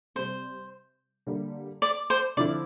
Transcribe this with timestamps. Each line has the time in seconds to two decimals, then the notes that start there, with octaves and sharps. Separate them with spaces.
0.15 C3 G3 C4 C5
1.27 D3 G3 A#3
1.82 D5
2.10 C5
2.37 D3 F3 C4 E4 D5